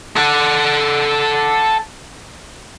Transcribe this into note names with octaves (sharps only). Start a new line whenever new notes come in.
A4 F#5